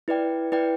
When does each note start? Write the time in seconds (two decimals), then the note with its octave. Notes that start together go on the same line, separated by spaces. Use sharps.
0.08 E4 B4 D5 G5
0.52 E4 B4 D5 G5